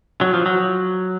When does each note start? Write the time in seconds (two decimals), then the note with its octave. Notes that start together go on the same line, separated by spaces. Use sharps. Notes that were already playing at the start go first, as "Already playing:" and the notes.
0.21 F#3
0.34 F3
0.46 F#3